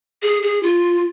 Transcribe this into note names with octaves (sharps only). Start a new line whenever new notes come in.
G#4
G#4
F4